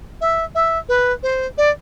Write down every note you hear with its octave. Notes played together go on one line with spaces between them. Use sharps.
E5
E5
B4
C5
D5